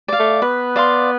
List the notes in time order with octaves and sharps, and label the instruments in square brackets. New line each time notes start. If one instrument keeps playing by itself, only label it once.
[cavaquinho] D5 F5
[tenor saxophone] A3
[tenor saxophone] B3 [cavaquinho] B4
[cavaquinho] D5 F5 C6